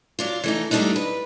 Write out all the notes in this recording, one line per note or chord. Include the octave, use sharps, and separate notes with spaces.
F#3 D4 F4
E3 A3 D#4
D#3 G3 A3 C4 D4 D#4
B4